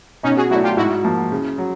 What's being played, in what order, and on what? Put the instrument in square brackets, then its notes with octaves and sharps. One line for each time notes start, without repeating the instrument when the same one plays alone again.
[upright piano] B2 [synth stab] C#4 D#4
[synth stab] F#4 G#4
[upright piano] F#3 A3 D4 [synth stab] E4 F#4
[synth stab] F4 G4
[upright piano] G#2 [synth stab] E4 F#4
[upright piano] F3 A#3
C#3
F#3